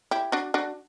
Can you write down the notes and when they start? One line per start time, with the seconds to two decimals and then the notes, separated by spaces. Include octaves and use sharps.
0.11 E4 G4
0.32 D4 F#4
0.54 D4 F#4